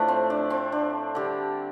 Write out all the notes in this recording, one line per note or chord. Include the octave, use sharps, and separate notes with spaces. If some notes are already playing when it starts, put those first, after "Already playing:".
Already playing: A2 F3 A3 D4
C4
D4
C4
D4
D3 G3 G4